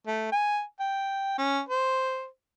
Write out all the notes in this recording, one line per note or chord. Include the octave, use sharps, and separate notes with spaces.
A3
G#5
G5
C#4
C5